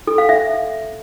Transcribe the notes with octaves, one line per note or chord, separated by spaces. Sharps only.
A4
F5
E5